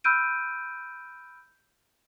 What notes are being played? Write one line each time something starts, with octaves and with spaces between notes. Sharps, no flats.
B5 E6 F6 G6 D7 D#7